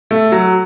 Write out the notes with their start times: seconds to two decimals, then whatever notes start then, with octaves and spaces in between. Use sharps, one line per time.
0.11 A3
0.32 F#3